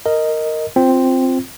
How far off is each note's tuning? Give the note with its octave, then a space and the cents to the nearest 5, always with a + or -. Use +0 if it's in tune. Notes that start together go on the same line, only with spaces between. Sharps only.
A#4 -10 D#5 +0
C4 +0 F4 +0